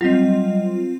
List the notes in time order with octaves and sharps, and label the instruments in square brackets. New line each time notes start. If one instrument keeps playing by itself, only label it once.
[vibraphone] F#3 G3 D#5 [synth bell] C4 F4